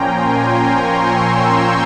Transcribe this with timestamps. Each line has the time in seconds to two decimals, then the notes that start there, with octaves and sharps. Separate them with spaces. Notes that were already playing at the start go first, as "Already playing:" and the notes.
Already playing: A#2 F3 A#3 C#4 G5 G#5 A#5 C6
0.59 A#5 C#6
0.97 C6 E6
1.35 E6 G6